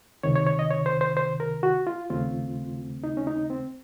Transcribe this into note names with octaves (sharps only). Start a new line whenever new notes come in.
C#2 C3 D#3 C#5
C#5
C#5
D#5
C#5
C5
C5
C5
A#4
F#4
F4
D#2 C#3 A3 C4 F4
D#4
C#4
D#4
C4